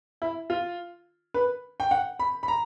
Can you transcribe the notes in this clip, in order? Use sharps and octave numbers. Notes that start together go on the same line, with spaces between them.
E4
F4
B4
G5
F#5
B5
B5
A#5